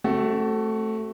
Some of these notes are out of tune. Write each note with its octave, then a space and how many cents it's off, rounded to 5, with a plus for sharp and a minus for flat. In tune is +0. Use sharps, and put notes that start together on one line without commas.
A3 +0 C4 +20 F#4 +30